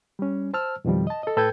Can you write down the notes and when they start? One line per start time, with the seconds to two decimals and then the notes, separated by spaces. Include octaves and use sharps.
0.19 G3 C#4
0.54 C5 A5 E6 F6
0.85 F2 B2 D#3 F3 G3
1.07 D#5 A5
1.23 A4 D#5
1.37 A2 A4 B4 G5 G6 G#6